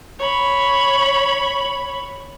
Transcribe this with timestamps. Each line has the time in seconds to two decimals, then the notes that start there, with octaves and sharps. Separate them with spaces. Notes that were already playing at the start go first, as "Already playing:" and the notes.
0.19 C#5 B5